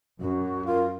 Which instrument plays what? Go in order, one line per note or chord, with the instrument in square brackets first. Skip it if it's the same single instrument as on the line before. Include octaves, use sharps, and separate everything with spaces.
[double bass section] F#2 [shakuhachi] F#4
[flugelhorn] F4 [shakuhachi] A#4